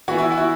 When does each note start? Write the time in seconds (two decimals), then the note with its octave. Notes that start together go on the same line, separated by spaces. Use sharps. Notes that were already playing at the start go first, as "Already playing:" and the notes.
0.08 E3 F#4
0.11 B3
0.18 E4
0.32 F#4
0.37 E4